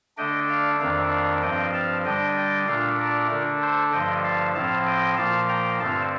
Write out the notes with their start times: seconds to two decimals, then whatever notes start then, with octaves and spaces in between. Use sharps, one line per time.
0.17 D3 A3 D4 D#5 G5
0.48 D5 F5
0.80 F2 D#3 A3 D4 D5 F5
1.11 D5 F5
1.42 G2 F3 C4 D#5 G5
1.74 F5 A5
2.05 D3 G3 D4 D#5 G5
2.36 D#5 G5
2.67 A#2 A3 D4 D5 F5
2.99 A#4 D5
3.30 D3 A3 D4
3.61 A4 C5
3.92 G2 D3 F3 A3 D#5 G5
4.24 F5 A5
4.54 A2 F3 C4 F5 A5
4.86 D#5 G5
5.17 A#2 F3 A#3 F5 A5
5.48 G5 A#5
5.80 G2 D3 A3 C4 F5 A5